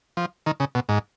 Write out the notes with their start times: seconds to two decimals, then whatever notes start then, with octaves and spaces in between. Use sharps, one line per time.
0.17 F3
0.46 D#3
0.60 C#3
0.75 B2
0.89 G#2